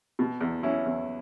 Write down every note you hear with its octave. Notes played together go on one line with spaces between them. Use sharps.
B2
E2
F#3 C#4 E4
E2